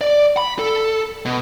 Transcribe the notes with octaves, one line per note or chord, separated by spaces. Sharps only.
D5
B5
A4
B2